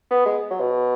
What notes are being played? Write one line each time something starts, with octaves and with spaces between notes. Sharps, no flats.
B3
G#3
F#3
B2